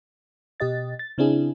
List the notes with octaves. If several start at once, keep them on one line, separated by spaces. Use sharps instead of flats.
B2 G4 D#5 A6
A6
C#3 C4 D4 E4 G#4